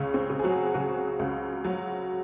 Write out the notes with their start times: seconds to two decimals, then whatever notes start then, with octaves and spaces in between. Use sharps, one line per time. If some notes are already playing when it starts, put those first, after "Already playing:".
Already playing: C#2 C#3 C#4
0.14 C4
0.30 C#3
0.39 G#4
0.44 F#3 F#4
0.74 C#3 F#3 F#4
1.19 C#2
1.65 F#3